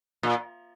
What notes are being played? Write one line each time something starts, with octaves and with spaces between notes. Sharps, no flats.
A#2